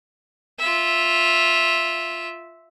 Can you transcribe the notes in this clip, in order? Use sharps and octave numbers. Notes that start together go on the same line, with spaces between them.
F4 E5